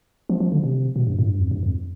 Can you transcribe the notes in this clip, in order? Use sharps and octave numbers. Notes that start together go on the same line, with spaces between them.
F3
F3
D3
C3
B2
G2
A2
G2
F2
G2
F2